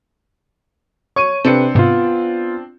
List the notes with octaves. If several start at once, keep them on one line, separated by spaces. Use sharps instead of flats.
C#5 C#6 D#7
C3 C4 D4 A4 B4 C#7
G#2 C3 B3 F4